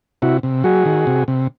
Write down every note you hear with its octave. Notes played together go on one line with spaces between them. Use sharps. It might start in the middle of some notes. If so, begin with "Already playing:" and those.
C3 E4 F#4
C3
F#3 F#4 G#4
D#3
C3
C3